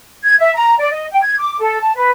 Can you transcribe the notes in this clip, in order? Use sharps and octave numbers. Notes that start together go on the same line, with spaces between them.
G#6
E5
A#5
D5
D#5
G5
G#6
D6
A4
A5
B4